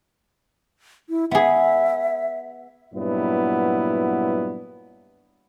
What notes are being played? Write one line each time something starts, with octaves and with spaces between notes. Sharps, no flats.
E4
B3 G#4 E5
G2 A#2 F#3 B3 E4